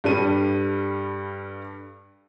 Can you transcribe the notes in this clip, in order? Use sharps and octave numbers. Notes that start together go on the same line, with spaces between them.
G2 G3 A4 D#7